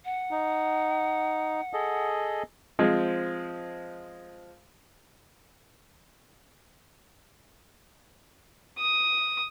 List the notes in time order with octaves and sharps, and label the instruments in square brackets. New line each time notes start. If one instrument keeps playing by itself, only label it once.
[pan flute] F#5
[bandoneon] D#4
G#4 A4 D#5
[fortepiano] F3 G#3 C4
[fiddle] D#6